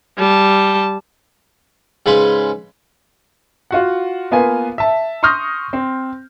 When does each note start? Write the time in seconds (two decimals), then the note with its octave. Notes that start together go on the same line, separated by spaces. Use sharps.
0.18 G3 A5
2.06 G#2 C#3 B4 C6
3.71 F4 F#4 F#5
4.32 A#3 B3 F4 B4 G#5
4.78 E5 A5
5.23 C6 C#6 D#6 F6 G6 A#6
5.73 C4